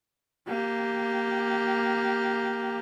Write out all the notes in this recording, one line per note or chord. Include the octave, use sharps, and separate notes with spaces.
A#3 G4